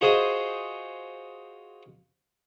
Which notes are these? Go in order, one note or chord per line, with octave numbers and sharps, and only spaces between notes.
F4 F#4 G#4 C5 D#5